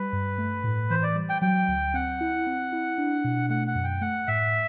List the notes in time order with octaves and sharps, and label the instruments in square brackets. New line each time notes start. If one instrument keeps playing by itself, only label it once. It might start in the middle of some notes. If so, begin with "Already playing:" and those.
Already playing: [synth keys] G3 [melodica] B4
[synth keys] G2
A3
A2
[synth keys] E3 [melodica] C5
[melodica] D5
[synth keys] G3
[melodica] G5
[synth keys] F#3 [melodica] G5
[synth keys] D2
[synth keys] C4 [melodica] F#5
[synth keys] E4
C4
E4
D4
B2
[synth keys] A3 [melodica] F#5
[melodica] F#5
[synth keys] F#2
[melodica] G5
[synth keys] A3 [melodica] F#5
[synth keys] A2 [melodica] E5